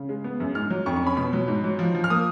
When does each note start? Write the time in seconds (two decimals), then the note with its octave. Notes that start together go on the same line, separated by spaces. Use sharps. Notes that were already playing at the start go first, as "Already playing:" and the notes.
Already playing: C#3
0.09 G#3
0.24 B3
0.40 F#2
0.55 G#2 F6
0.70 F#3
0.86 F2 C#6
0.96 C#6
1.02 C#4 B5
1.17 B2 B5
1.33 F#3
1.48 G#2
1.64 F#3
1.79 F3
1.95 F3
2.04 F6
2.10 A#3 D#6